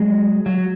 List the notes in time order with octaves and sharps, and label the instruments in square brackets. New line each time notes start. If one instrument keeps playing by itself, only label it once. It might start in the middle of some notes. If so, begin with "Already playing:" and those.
Already playing: [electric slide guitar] F#3 G#3
F#3